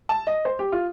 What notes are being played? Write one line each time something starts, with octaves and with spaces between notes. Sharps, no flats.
A5
D#5
C5
G4
F4